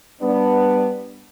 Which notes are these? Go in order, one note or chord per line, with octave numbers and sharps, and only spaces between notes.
G3 B3 D4